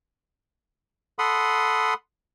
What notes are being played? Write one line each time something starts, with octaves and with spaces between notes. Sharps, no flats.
A4 F#5 B5 C6 D#6